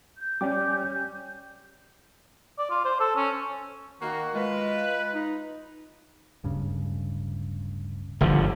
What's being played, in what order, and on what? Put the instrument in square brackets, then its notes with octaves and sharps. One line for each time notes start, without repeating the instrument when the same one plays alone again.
[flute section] G6
[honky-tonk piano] G3 C#4 [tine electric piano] D5 G5 D6
[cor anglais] D5
F4
C5
A4
C#4
[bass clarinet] D#3 [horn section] A#3 D#4 F#4
[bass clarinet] G#3 [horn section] F4 B4
[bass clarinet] D#4
[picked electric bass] D1 G2 C#3
[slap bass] G1 D3 F3 [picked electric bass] G#2 D#3